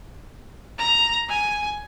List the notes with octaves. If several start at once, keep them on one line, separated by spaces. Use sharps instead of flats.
A#5
G#5